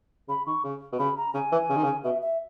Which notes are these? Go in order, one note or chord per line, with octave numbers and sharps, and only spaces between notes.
C#3 B5
D#3 C#6
C#3
B2
C#3 B5
A#5
C#3 G#5
E3
C#3
D#3
C#3
B2 E5
E5